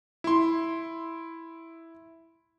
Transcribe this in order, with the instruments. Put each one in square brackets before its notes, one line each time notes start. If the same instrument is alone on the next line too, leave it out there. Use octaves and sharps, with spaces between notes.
[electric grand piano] E4 C6